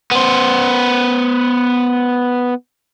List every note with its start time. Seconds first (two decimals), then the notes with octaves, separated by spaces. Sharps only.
0.11 B3 C5